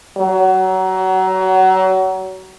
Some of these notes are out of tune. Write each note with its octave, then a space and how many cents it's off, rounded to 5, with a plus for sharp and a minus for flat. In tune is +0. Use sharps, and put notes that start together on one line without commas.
F#3 +25